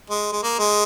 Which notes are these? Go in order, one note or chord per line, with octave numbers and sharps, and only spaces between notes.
G#3
G#3
A#3
G#3